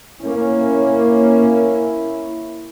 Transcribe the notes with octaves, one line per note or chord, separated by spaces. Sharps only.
A#3 C#4 E4